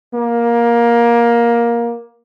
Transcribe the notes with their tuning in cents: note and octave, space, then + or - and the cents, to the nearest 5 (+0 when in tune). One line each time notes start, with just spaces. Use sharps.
A#3 +15